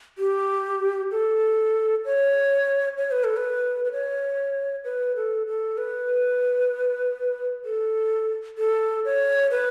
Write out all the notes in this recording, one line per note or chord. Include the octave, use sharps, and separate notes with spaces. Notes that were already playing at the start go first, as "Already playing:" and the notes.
G4
A4
C#5
C#5
B4
A4
B4
B4
C#5
B4
A4
A4
B4
A4
A4
C#5
B4